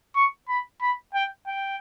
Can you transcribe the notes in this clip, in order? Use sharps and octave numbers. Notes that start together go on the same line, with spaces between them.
C#6
B5
B5
G5
G5